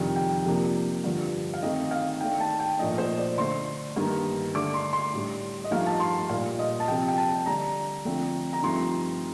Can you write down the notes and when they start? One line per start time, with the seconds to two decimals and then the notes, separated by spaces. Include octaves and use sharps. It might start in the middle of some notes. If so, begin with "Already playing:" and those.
Already playing: F2 C3 D#3 G3 D4 G5
0.16 G5
0.45 C3 F3 A#3 D4
1.04 G2 D3 F3
1.54 F5
1.62 D#3 A3 C4 D#4 D#5
1.91 F5
2.20 D#3 A3 D4 G5
2.40 A5
2.60 G5
2.79 A#2 F3 A3 D4 D#5
2.98 C5
3.18 D5
3.37 D3 A3 D4 C6
3.96 G2 D#3 A#3 D#4
4.54 D3 A3 D4 D6
4.74 C6
4.93 C6
5.13 A2 G3 D4
5.64 D#5
5.71 G2 F3 A3 D#4 F5
5.86 A5
6.00 C6
6.29 A#2 G3 A#3 F5
6.59 D#5
6.80 A5
6.88 C3 F3 C4 G5
7.08 G5
7.17 A5
7.46 D3 G3 D4 A#5
8.05 D3 F3 A3 C4
8.53 A#5
8.63 G2 F3 A3 C4 D#4 C6